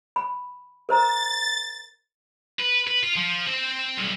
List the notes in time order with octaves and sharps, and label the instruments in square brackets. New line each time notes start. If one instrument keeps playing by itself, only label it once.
[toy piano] B5
[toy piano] A#4 C5 A#5 [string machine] A6
[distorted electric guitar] B4
B4
F4
F3
C4 C5
B1 G2